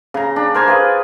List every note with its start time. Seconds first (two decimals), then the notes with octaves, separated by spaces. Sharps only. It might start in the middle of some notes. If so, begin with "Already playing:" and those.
0.14 C#3 A#5
0.36 D4
0.54 A#4 C5 G#5 D6
0.68 F4 G#4 B4